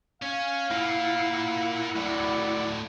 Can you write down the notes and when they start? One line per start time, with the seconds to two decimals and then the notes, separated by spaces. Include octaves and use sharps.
0.22 C#4 F5
0.71 A#3 E4 F4 F#5
1.96 A2 F#3 D5